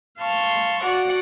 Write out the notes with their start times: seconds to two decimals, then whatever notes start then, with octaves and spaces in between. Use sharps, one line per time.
0.18 F5 A5 C6 C#6
0.83 F#4 D5 F#5